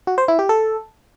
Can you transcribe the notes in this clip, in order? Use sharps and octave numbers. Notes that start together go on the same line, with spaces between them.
F#4
C5
E4
G4
A4